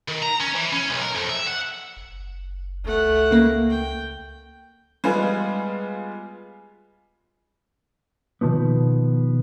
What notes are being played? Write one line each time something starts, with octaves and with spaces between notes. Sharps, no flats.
D#3
A#5
C#4
E3
C#4
B1
A#4
F2
E5
F#5
F#1
C#2 A3 F#5
C#3 A#3
G5
G3 G#3 B3 F4 G#4
B2 D#3 F3 B3